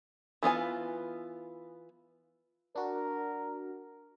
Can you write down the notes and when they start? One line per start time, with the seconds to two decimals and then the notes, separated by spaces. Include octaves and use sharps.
0.43 E3 B3 F4 G#5
2.76 D4 F#4 A#4